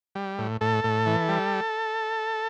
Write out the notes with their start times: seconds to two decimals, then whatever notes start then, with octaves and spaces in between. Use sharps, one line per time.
0.15 G3
0.38 A2
0.61 A2 A4
0.84 A2
1.06 E3
1.28 G3